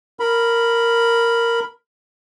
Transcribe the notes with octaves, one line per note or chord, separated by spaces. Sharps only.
A#4 B5